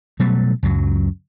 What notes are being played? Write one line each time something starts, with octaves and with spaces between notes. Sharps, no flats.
B2 F#3 G3 A3
C#2 F#2 F#3